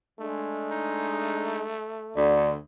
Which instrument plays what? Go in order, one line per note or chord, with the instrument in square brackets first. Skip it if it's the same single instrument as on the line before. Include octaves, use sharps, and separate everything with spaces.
[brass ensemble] G#3 D4 [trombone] A3
[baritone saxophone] D#4
[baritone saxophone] D2 [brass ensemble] D3 [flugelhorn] D5